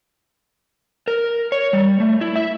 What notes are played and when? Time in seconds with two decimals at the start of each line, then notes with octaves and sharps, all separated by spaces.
1.08 A#4
1.52 C#5
1.73 G3
2.00 A3
2.21 E4
2.36 E5